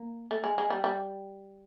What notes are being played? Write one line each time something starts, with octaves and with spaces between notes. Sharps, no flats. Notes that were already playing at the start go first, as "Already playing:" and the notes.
Already playing: A#3
A3
G#3
G#3
G3
G3